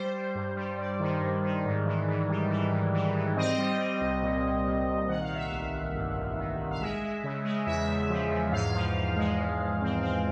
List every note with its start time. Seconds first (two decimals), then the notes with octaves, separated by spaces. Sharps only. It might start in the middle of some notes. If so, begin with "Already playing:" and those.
Already playing: G3 C5
0.14 G3
0.35 G2
0.56 G3
0.78 G2 D5
1.00 D#3
1.21 G2
1.43 D#3
1.65 G#2
1.85 E3
2.08 G#2
2.29 G3
2.50 E3
2.71 G#2
2.94 E3
3.14 G#2
3.36 C4 D#5
3.58 G3
3.79 C4
4.01 C2
4.22 A#2
4.44 A#2
4.66 A#2
4.87 C2
5.08 D#3 F#5
5.22 F5
5.29 D#3
5.35 E5
5.47 A1 F5
5.73 A1
5.95 G2
6.16 A1
6.37 D#3
6.59 A1
6.71 F5
6.80 G#3 E5
7.01 G#3
7.23 C#3
7.44 G#3
7.66 E2 E5
7.88 E2
8.10 F3
8.30 E2
8.52 G#2 F5
8.74 F3
8.96 F3
9.16 G#3
9.38 G#2
9.60 G#2
9.81 C4
10.03 C4